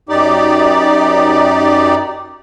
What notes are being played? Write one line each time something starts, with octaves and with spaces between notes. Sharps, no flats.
F#2 D#4 G4 D5